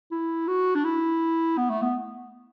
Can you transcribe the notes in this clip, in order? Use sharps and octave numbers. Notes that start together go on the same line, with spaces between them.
E4
F#4
D4
E4
B3
A3
B3